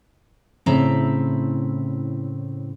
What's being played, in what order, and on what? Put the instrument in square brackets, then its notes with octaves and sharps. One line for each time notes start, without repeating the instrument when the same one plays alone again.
[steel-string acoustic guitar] A2 C#3 C4 E4 A#5